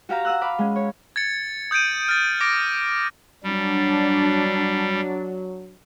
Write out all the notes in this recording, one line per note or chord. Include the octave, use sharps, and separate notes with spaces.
F#4 G4 F5 A#5
F#5 D#6 E6 F#6
F5 B5 D6
G#3 C#4
C#5
G#6 A6 C#7
D#6 G6 G#6 D7 D#7
F6 A6
D6 A#6 D7
F#3 G3 D4